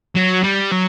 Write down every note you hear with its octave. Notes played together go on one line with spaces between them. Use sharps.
F#3
G3
F#3